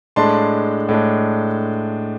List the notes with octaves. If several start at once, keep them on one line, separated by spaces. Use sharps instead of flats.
A2 G#3 D4 A5 C6
A2 G#3 D4